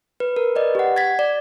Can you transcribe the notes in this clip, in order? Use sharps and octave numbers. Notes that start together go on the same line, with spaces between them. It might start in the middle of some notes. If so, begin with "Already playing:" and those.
B4
A#4
B4 D5 D#5
G4 F#5
G#6 A6 B6
D5